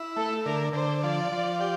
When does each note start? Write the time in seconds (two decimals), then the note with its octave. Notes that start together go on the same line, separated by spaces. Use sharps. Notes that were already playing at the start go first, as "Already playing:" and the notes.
Already playing: E4
0.16 A3 A4
0.45 D3 A#4
0.73 D3 C5
1.03 F3 D5
1.32 F3
1.61 G4